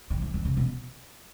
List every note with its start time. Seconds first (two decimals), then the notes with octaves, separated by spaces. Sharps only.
0.10 D#3
0.22 E3
0.34 D#3
0.45 C#3
0.57 B2